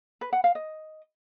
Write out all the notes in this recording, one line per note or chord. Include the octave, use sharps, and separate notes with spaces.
B4
F#5
F5
D#5